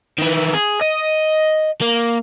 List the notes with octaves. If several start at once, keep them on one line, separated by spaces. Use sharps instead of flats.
D#3 E3
G#4
D#5
A#3